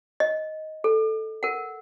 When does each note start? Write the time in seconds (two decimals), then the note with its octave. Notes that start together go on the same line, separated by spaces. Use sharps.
0.20 D#5
0.84 A4
1.43 A#4 F#5